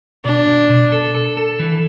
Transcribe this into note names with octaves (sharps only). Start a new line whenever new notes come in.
B2 D4
B2
B2
A4
A4
A4
E3